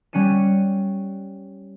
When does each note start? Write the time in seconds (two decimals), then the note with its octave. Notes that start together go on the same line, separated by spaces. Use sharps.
0.13 G3 C#4 F#5 C#7 D#7